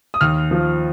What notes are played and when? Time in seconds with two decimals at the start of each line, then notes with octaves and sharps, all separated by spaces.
0.14 D#6
0.21 D#2 F6
0.51 F3